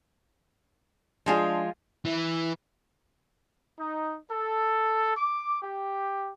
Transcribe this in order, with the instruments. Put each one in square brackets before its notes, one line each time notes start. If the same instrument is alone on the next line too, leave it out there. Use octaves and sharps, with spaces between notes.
[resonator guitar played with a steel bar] F3 G#3 F4 [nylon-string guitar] D4 G#4
[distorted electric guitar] E3
[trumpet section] D#4
A4
D6
G4